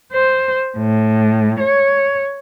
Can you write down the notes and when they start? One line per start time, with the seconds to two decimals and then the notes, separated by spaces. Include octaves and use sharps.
0.13 C5
0.78 A2
1.60 C#5